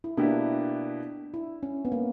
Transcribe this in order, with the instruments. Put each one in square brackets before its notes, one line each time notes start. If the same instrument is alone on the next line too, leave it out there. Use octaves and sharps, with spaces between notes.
[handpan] E4
[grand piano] B2 A#3 E4 G4 B4 [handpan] D4
[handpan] E4
C#4
B3
A#3